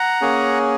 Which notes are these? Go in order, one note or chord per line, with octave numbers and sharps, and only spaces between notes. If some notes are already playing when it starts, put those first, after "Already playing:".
Already playing: F#5 A#5
A#3 C#4 G#4